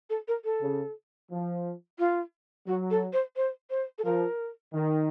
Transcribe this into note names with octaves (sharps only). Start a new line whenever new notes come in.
A4
A#4
A4
C#3
F3
F4
F#3 F#4
A4
C5
C5
C5
A4
F3 A#4
D#3